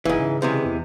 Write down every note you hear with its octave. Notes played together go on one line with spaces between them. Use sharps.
F#1 G#2 E3
C#3
C3 E3 G#3
E2